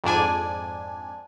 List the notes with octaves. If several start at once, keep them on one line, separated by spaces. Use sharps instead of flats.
F2 G#2 D4 G#5